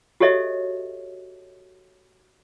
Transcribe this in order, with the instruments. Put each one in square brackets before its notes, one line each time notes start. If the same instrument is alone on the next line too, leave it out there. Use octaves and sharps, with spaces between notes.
[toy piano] F#4 G4 A4 C#5 D#5 E5